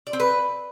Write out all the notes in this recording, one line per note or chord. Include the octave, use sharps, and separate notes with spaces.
D5
C4
B4